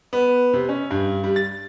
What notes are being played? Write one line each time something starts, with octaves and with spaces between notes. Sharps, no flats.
B3
C3
C#4
G2
G3
A6